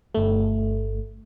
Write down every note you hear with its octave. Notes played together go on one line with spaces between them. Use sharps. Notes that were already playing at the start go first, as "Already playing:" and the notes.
G1 A3